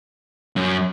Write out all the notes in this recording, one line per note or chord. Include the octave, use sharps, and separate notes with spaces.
F#2